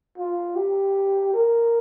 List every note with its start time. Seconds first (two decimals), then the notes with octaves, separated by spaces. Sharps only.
0.18 F4
0.56 G4
1.34 A#4